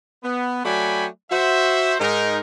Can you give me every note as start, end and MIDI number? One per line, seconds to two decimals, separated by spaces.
0.23 0.62 59
0.64 1.06 54
0.64 1.06 57
0.64 1.06 74
0.64 1.06 79
0.64 1.06 80
0.64 1.06 83
1.30 1.93 66
1.30 1.93 72
1.30 1.93 76
1.99 2.40 44
1.99 2.40 63
1.99 2.40 70